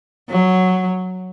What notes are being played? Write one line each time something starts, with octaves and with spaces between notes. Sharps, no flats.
F#3